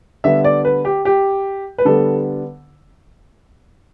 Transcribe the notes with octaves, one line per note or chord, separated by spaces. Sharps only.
D3 G3 B3 E5
D5
B4
G4
G4
B4
D3 G3 B3 A4